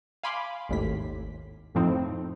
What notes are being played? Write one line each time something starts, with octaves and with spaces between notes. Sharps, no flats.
F5 G#5 B5 C6 D6
G#1 D#2 A2 B6
F2 A2 F3 C4 D#4